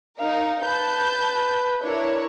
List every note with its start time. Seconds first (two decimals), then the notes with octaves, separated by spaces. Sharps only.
0.19 D#4 A#4 F5
0.64 B4 A5 G6
1.83 D4 E4 A#4 C#5